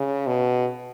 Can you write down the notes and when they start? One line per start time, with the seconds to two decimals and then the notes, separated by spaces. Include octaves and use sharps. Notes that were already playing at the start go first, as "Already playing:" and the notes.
Already playing: C#3
0.27 B2